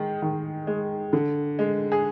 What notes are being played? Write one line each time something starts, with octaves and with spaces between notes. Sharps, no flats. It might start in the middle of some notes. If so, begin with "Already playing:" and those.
Already playing: D#3 G#3
D#3
G#3
D3
G#3
G#4